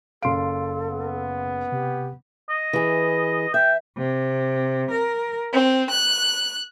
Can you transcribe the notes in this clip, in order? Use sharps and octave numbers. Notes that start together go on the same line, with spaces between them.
F#1 A4 F5 C6 D7
B3
C3 G4
D#5
E3 G#4
E5 G5
C3
A#4
C4
F#6